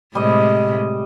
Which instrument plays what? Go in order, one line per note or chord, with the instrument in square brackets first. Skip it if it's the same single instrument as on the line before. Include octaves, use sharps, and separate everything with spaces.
[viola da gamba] A2 C3 G#3 [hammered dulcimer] G3 D#5